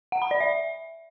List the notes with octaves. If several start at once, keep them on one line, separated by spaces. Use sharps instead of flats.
F#5
B5
D5
E5